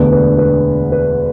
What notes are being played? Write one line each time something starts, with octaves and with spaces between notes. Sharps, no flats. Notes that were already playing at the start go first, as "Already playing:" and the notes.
Already playing: E1 D2 D3 B3 D4 B4
B4
B4
B4